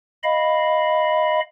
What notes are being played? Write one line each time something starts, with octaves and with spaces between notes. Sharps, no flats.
D#5 F5 B5